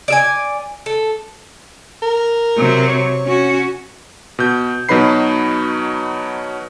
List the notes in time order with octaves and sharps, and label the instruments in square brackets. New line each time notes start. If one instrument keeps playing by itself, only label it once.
[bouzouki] D5 E5 G#5
A4
[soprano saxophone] A#4
[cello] C3 F#3
[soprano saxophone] C#5
[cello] C#4 F#4
[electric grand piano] B2 G6
B2 F#3 D#4 B4 B5 C7